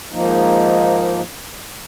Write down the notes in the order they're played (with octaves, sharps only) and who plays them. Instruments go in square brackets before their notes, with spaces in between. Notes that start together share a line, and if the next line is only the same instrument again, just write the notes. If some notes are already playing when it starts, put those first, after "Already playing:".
[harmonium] G#2 D#3 F3 A#3 D#4